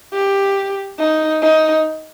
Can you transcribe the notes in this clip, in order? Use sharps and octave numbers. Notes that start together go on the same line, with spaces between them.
G4
D#4
D#4